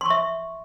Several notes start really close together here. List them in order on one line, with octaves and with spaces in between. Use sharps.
C6 C#6 E5